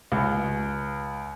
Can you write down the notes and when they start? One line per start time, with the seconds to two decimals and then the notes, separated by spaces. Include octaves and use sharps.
0.12 C#2